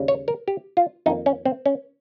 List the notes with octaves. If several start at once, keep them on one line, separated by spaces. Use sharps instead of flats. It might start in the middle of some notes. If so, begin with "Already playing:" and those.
Already playing: D#2 C#3 G3
C#5
A#4
G4
F4
F2 D#3 A#3 D#4
C#4
C4
C#4